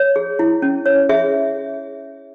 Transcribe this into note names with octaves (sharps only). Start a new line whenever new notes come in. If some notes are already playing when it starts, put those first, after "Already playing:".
Already playing: C#5
G#4
E4
C#4
C#5
G#4 E5